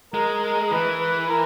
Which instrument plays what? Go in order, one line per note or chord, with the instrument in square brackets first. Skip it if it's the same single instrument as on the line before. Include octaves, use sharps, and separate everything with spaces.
[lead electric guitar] G#3 [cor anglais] A#4
[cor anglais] A#4
[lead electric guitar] E3 [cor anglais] B4
[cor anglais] B4
A#4